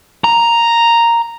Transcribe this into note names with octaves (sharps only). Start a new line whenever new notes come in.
A#5